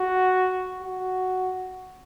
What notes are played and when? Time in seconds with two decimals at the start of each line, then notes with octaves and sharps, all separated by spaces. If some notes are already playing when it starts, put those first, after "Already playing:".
Already playing: F#4
0.82 F#4